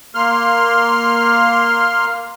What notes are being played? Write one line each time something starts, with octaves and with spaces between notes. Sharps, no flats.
A#3 C6 F6